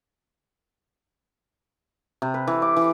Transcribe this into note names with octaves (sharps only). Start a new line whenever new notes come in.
C3
B4
E3
D6
E3